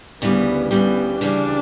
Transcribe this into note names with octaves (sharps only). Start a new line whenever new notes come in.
D2 C#3 E3 G3 B3
D2 C#3 E3 G3 B3
D2 C#3 E3 G3 D4